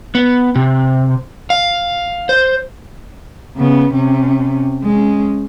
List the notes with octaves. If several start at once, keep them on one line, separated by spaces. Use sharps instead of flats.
B3
C3
F5
C5
C#3 B3
C3 C#4
G#3 C#4